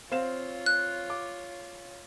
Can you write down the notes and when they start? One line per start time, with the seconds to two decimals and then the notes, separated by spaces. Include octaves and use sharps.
0.12 C4 F4 C#5 F5 E7
0.66 F#6
1.10 D6